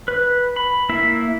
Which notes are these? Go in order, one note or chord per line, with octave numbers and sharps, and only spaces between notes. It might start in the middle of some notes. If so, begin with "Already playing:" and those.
B4
B5
A#3 E4 E5